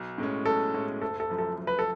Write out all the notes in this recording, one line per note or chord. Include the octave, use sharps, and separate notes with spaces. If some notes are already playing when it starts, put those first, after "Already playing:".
Already playing: B1
A2 G#3 C#4
B1 A4
A2 G#3 C#4
F#1 A4
A4
F#2 F3 A3
A4
F#1
B4
A4